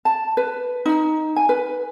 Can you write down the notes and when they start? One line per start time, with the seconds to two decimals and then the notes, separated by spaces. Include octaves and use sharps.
0.05 A5
0.37 B4
0.86 D#4
1.36 G#5
1.49 B4